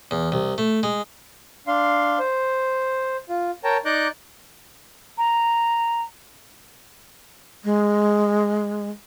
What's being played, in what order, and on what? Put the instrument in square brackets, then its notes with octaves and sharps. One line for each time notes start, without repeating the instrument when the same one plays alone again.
[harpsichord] E2
C2
A3
G#3
[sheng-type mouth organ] D4 F5 C6
C5
F4
A#4 C#5 G5 A5 A#5
D#4 D5 A#5 D6 F#6 G6
[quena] A#5
[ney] G#3